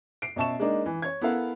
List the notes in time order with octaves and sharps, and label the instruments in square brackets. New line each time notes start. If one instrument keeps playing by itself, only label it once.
[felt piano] C7 D7
B2 C#4 E5 A5 C#6 E7
G#3 A#3 D4 D#4
E3
C#5 G#6
B3 E4 A4 A#4 F5 F#5